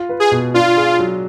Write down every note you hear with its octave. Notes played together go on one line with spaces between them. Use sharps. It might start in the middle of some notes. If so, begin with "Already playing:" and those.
Already playing: F4
B4
G#4
B2
D4 F4
G#4
F#3